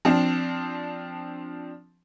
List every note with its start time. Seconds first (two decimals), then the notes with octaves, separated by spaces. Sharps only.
0.05 F3 C4 D4